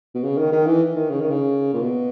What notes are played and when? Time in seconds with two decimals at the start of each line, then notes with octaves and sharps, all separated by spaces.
0.15 B2
0.24 C#3
0.38 D#3
0.52 D#3
0.66 E3
0.95 D#3
1.10 C#3
1.20 D#3
1.31 C#3
1.73 A#2
1.81 B2